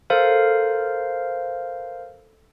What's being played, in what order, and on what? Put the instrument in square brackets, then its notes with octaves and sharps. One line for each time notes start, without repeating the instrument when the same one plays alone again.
[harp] A4 [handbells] A#4 C5 F5